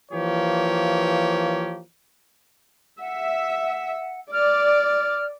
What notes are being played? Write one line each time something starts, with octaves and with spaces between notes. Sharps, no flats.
E3 F3 A#3 G4 C#5
E5 F#5
D5 F6